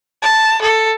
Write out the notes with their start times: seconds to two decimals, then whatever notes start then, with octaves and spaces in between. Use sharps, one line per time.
0.22 A5
0.62 A4